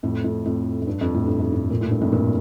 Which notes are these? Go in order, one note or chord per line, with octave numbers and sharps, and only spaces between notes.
F2 A2
F2 A2
F2 A2
F2
G2
F2
A2
G2
F2
G2
A#2
A2
G2
F2 A2
G2 A#2